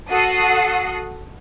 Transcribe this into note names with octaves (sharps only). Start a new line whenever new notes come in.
F#4 A4 F#5 D#6 C7